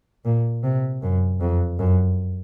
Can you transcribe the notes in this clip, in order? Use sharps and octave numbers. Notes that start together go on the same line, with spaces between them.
A#2
C3
F#2
F2
F#2